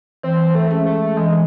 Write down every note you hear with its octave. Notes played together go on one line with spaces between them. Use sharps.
E3 C4
A3
G#3 C#4 G#4
A3
E3 G#3